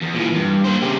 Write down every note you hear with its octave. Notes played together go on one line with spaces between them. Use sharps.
E2
A#2 E3
G2
A#3 C5
C#3 G4